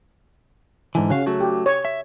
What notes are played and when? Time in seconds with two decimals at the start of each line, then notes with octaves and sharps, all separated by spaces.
0.95 G#2 D3 E3
1.10 C#3 F#4 F5
1.26 F#3 A3 F#4
1.40 G4
1.66 C#5
1.85 E5